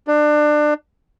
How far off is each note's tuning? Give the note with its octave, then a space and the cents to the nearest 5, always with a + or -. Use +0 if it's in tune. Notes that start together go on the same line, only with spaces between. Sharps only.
D4 +25